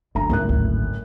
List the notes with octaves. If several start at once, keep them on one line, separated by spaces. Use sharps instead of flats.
F#1 D2 A#5
F#1 A2 D#3 G#3 F#6
G#1 D2